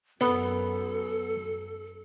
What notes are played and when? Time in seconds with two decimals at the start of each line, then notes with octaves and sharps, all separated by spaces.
0.21 F#2 B3 A4